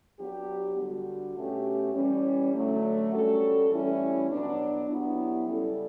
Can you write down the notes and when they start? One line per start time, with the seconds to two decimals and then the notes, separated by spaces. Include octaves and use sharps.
0.19 F#3 B3 D4 G4
0.78 D3 G3 D4 F#4
1.36 B2 A3 C#4 G4
1.95 E3 G3 C#4
2.54 D3 F#3 A3
3.12 G3 C#4 F#4 A4
3.71 A2 E3 G3 C#4 E4
4.30 B2 F#3 B3 D4
4.89 F#3 B3 E4 G4
5.47 C#3 G3 C#4 E4 A4